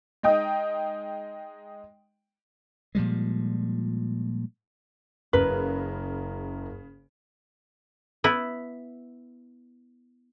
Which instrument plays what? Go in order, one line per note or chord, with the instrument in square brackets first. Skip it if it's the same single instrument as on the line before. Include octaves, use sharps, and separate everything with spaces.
[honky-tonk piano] G#3 D#4 G5 D#6
[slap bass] A#2 F3 G3 G#3
[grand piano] F#1 A#4 [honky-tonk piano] C#3 [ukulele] B4
[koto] B3 E4